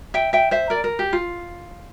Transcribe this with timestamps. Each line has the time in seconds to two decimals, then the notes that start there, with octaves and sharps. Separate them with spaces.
0.14 E5 G5
0.33 E5 G5
0.51 C5 E5
0.70 A#4 D5
0.84 A#4
0.99 G4
1.13 F4